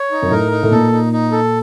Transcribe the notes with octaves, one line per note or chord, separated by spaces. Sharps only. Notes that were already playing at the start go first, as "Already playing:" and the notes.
Already playing: C#5
D#4
F#2
A2 A#4
D#4
A2
A#2 A4
D#4
D#4
A4